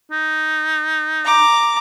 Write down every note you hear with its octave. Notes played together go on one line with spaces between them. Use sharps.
D#4
A#5 D6